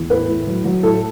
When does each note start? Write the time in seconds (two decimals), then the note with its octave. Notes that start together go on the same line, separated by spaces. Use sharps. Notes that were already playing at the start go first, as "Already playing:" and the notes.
Already playing: E2
0.10 A2 B4
0.28 A2
0.47 F#3
0.64 F#3
0.83 A2 A4